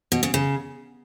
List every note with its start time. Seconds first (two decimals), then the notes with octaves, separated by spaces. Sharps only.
0.12 B2
0.23 C#3
0.34 C#3